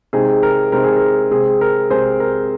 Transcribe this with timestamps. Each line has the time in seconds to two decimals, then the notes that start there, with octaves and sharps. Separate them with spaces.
0.13 C3 G#3 C4 D#4 G#4
0.43 A#4
0.72 C3 G#3 C4 D#4 A#4
0.84 G#4
0.96 A#4
1.31 C3 G#3 C4 G#4
1.61 A#4
1.90 C3 G#3 C4 G#4 C5
2.20 A#4